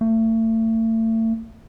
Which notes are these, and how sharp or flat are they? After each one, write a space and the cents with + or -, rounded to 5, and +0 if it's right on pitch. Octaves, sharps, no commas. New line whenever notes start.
A3 +35